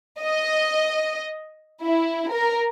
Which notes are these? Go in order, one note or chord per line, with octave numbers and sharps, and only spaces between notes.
D#5
E4
A#4